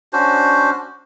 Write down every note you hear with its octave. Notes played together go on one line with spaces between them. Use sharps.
C#4 D4 F#4 C5